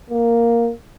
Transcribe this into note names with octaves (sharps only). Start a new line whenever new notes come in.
A#3